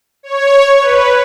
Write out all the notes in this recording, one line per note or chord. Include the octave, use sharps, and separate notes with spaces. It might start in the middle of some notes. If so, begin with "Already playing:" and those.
C#5
B4